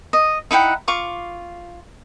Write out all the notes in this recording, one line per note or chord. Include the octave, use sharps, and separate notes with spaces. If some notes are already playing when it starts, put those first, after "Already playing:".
D#5
D#4 E4 F#5 G5
F4 C#6 D6